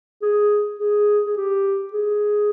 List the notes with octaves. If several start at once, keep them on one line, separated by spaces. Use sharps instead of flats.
G#4
G#4
G#4
G4
G#4